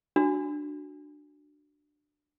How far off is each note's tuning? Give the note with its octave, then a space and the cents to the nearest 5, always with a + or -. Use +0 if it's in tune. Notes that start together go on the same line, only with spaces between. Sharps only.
D4 +10 F#4 +0